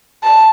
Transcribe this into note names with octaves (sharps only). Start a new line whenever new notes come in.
A5